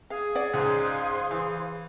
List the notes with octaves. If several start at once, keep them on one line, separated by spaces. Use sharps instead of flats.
G#4 F5
D5 F#5
C#2 G#2 C5 F5 C6
E3